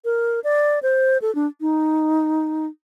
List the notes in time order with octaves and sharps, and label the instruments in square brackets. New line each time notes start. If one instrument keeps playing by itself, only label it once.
[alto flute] A#4
D5
C5
A4
D4
D#4